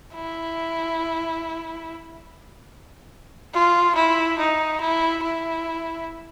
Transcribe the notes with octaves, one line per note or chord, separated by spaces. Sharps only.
E4
F4
E4
D#4
E4
E4